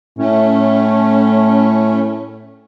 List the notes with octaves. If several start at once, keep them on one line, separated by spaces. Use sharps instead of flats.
A2 A3 C#4